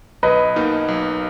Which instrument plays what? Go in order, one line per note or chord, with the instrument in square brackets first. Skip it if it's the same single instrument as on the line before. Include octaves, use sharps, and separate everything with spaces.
[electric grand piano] B1 [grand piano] B4 D#5
[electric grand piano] B2 A#3 D#4
B1